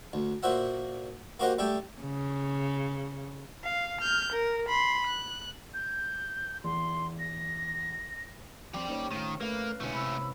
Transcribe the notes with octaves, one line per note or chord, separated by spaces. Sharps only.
D2
A#2 F#4 C5 E5 F#5
A#3 F#4 G4 C5 D#5 F#5
G3 A3 G4 A4 G5
C#3
F5
F6 G6
A#4
B5 C6
F#6
G6
E2 C6
A#6
F3 C4 G4 D5
A#3 C#4 D#4 C5 C#5
A2 D#3 F4
A3 A#3 B4 F5
B2 D3 G#3 A3 C#4 E4 C#5
C3 B5 E6